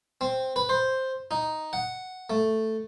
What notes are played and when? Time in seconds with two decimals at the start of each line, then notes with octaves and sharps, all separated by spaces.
0.21 C4
0.56 B4
0.69 C5
1.31 D#4
1.73 F#5
2.30 A3